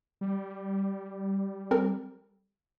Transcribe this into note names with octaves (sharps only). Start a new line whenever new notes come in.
G3
C4 A4 A#4